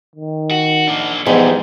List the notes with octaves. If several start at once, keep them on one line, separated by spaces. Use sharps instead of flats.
D#3
F#4
A#3 D4
G#2 E3 F3 G3 G#3 B3